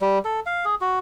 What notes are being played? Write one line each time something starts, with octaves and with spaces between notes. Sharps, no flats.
G3
A4
F5
G#4
F#4